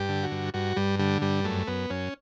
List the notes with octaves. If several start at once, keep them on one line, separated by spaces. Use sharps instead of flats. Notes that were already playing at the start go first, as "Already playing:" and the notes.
Already playing: G2 G4
D3
F#4
G2
G2 F#4
G2 G3
D3 G3
G2 G3
F#2 A3
F#2 B3
F#2 C#4